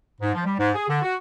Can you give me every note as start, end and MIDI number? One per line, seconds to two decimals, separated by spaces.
0.21 0.33 44
0.34 0.44 53
0.46 0.54 55
0.59 0.70 44
0.75 0.87 68
0.89 1.02 50
1.02 1.16 66